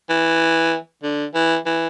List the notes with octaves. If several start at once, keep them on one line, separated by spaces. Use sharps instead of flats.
E3
D3
E3
E3